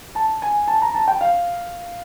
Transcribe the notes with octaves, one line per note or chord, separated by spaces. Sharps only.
A5
G#5
A5
A#5
A5
G5
F5